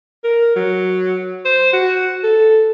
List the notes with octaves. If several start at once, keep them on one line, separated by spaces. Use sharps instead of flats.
A#4
F#3
C5
F#4
A4